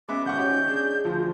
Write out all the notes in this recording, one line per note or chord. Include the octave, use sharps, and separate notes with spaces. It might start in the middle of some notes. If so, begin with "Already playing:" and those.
G#3 B3 C#4 E5 D6
G#1 F#5 C#6 G6
D#4 G4 C#5
D4 G#4
D2 F3